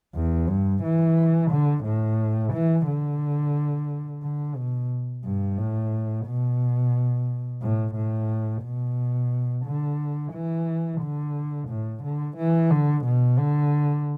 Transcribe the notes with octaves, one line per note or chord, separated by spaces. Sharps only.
E2
G2
E3
D3
A2
E3
D3
D3
B2
G2
A2
B2
A2
A2
B2
D3
E3
D3
A2
D3
E3
D3
B2
D3